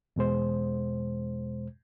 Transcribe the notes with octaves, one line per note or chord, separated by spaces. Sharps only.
E2 B2 G#3 C5